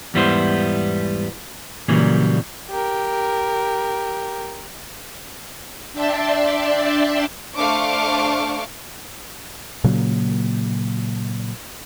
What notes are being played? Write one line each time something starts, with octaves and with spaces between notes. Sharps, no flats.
E2 G#2 G3 B3 E4 C5
A#2 C#3 E3 F#3 G3 A#3
G4 A#4
D4 D5 E5 G5 A5 C6
A3 D4 C5 F5 C#6 D6
A#2 C#3 F#3 A#3